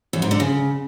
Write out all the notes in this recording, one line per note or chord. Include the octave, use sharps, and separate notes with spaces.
E2
G#2
D3
C#3